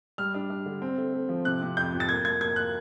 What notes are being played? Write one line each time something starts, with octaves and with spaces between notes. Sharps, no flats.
G3 F6
D4
D4
D3
C4
A3
A3
F3
C3 F#6
C3
F2 G6
F2
A6
A#3 G#6
A#3 G#6
A#3 G#6
A#3 F#6